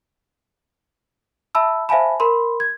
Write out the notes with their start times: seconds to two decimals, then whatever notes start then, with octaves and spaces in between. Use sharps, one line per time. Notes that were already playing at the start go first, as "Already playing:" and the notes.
1.55 E5 A5 B5 E6
1.89 C5 E5 F5 G#5 A5 B5
2.20 A#4 B5 C6
2.60 G#6